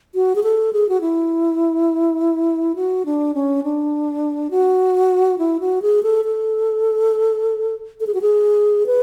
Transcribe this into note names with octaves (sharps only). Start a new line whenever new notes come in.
F#4
G#4
A4
G#4
F#4
E4
F#4
D4
C#4
D4
F#4
E4
F#4
G#4
A4
A4
A4
G#4
F#4
G#4
B4